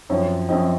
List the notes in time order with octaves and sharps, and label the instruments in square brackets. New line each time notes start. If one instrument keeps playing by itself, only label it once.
[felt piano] F#2 F3 C4 C#5
F#2 F3 C4 D#5